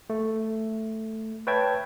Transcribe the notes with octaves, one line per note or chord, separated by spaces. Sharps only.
A3
B4 C#5 E5 G5 A5 G#6